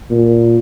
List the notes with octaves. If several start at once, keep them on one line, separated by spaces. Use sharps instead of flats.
A#2